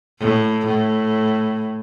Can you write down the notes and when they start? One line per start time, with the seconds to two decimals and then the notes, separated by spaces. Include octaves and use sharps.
0.19 A2
0.66 A2